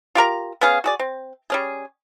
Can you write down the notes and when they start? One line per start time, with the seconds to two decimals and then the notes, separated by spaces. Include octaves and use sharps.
0.15 F4 G4 A#4 A#5
0.61 B3 C#4 G#4 F5
0.84 F#4 G#4 D5
0.99 C4
1.50 G3 C#4 G#4